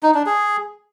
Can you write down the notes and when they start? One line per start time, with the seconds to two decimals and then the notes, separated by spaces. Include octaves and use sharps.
0.03 D#4
0.14 D4
0.26 G#4